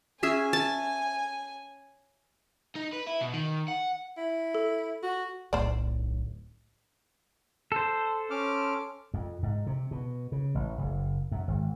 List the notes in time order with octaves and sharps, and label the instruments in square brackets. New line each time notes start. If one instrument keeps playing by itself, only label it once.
[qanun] C#4 G#4 E5 [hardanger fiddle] G#5
[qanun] A5
[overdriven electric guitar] D#4
B4
E4
B2
D#3
F#5
[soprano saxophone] E4
[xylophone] A4
[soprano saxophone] F#4
[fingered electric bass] D1 [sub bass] B1 [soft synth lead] A2 [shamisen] C5 D5
[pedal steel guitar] A4 C5
[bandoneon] C#4 D6 F6
[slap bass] F2
G#2
C3
B2
C#3
A1
F#1
F#2
G#1